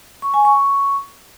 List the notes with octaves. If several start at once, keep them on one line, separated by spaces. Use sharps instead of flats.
C#6
G#5
C#6